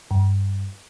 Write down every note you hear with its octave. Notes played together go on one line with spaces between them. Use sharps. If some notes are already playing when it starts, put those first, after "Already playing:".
G2